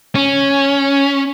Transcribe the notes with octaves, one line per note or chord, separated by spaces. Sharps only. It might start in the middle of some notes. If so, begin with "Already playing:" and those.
C#4